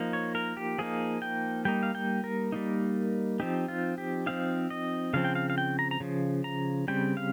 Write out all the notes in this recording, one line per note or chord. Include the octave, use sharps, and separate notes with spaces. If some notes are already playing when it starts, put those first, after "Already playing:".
Already playing: F3 A#3 D#4
C#5
A#4
G4
F3 A#3 D#4 G#4
G5
G3 A#3 D#4 G5
F5
G5
A#4
G3 A#3 D#4
F3 C4 D#4 G4
F4
G4
F3 C4 D#4 F5
D#5
C#3 F3 C4 F5
G5
F5
F5
G5
A#5
A#5
C#3 F3
A#5
C#3 G3 C4 G5
F5